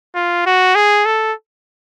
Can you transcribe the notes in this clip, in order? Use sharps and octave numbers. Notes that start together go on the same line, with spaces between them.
F4
F#4
G#4
A4